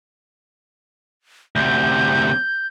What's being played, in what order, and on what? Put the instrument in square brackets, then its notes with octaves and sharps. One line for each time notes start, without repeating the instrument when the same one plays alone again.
[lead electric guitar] D2 C3 [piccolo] G6